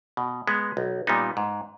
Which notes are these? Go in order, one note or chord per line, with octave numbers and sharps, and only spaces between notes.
B2
G#3 B3
B1
A#2 G3 B3 D#4
G#2